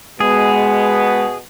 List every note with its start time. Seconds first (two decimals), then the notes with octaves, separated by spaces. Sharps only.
0.20 B2 G#3 B3 G#4